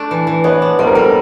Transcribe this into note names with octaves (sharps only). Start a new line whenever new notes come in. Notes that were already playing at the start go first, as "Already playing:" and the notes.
Already playing: A3 D4
E3
E3
B3 C#5
D4
G3 C5
A#4
G3 A4